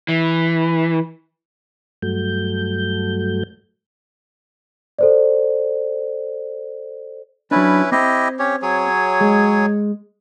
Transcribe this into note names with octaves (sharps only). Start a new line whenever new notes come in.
E3
G2 F#3 A3 G6
A4 C5 D5
F#3 C#4 D4 E4 B4
C4 E4 G4 D#5
C#4 G4 C#5
F#3 G#4 C#5
G#3